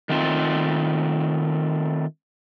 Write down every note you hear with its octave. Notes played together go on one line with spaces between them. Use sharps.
D#3 A3 C4 F4